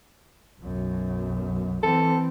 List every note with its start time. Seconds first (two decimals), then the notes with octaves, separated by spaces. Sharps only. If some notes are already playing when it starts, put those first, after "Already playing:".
0.61 B1 F#2
1.83 E3 C4 A4